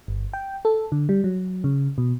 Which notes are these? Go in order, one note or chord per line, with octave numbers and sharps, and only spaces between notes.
G1
G5
A4
D3
G3
F#3
C#3
B2